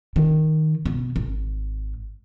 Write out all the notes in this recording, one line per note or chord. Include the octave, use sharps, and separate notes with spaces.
D#3
B2
G#1